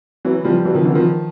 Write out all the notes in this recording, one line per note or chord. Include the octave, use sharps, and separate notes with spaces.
E3 F#3
F3 G3
E3 F#3
D#3 F3
D3 E3
D#3 F3